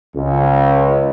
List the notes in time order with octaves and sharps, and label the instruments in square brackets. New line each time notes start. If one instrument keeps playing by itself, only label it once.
[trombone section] C#2